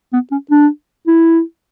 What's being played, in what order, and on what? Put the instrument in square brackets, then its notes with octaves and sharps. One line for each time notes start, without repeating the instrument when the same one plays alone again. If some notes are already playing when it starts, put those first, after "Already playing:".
[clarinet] B3
C#4
D4
E4